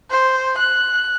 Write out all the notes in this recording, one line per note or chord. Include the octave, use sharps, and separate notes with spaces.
C5
F#6